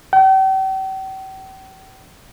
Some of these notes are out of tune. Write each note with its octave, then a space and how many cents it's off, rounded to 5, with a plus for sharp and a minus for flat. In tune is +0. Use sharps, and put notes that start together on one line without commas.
G5 -40